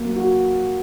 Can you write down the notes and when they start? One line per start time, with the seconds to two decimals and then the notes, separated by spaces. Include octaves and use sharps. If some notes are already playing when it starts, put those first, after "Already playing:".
Already playing: F#3 A#3
0.16 F#4